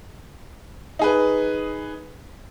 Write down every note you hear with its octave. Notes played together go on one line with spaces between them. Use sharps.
D#4 G#4 B4